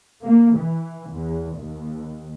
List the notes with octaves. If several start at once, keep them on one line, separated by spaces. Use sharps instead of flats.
A#3
E3
E2
D#2